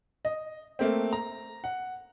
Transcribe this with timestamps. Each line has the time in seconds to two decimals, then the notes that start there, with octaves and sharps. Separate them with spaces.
0.25 D#5
0.79 A3 A#3 C4
1.13 A#5
1.64 F#5